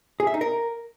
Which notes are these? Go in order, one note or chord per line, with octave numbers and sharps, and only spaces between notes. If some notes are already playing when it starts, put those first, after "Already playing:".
G#4
E5
D#4
A#4